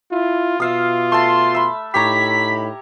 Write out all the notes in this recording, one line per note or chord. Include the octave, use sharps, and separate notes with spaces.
E4 F4
B2 F4 E5 F5 D#6
A3 A5 C6
E5 B5
A2 D#4 G4 C#5 A#5 B5 B6